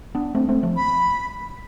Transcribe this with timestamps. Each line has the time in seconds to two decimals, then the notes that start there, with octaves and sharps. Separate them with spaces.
0.15 B3 D4
0.35 A3 C4
0.49 A3 C4
0.63 F3 A3
0.76 B5